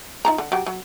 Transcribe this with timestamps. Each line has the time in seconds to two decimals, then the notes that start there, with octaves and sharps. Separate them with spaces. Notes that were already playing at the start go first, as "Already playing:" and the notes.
0.25 D#4 F4 A#5
0.38 D3
0.52 F#3 G4
0.66 F#3